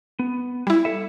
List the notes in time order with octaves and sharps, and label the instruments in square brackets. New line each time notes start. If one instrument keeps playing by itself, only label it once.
[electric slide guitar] B3
[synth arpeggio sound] G3 E4
[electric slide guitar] A4 E5